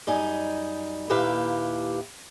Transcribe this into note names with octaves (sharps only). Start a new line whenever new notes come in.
F#2 G3 D#4 G#5
D#2 A#2 E4 G4 B4 F5